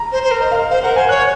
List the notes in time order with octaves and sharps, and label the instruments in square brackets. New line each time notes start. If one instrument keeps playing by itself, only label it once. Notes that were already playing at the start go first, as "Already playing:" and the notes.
Already playing: [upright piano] A#5
[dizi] C5
C5
A#4
[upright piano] D#5
F5
[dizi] C5 [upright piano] F5
[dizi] A#4 [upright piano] F#5
[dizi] C5 [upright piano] G#5
[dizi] C#5 [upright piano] F#6